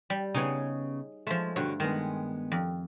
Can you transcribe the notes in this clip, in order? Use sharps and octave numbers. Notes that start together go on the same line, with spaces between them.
G3
C#3 B3 D#4 G#4 C#5
F3 G#3 A3
G2 D3 F#4 C#5
G2 D#3 G#3 B3
F2